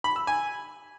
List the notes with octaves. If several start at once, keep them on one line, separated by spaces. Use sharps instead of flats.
B5
E6
G#5